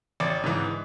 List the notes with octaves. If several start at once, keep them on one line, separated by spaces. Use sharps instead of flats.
A1 D5
G#2 E3